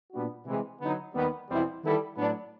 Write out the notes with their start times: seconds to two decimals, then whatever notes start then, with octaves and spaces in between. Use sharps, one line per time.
0.12 A#2 G3 B3 D4 F#4
0.46 C3 E3 G#3
0.80 D3 F#3 B3 D#4
1.14 D#2 D#3 G3 B3
1.49 E2 B2 G3 C4 E4
1.83 D#3 G3 B3 E4 A4
2.17 A2 F#3 B3 D4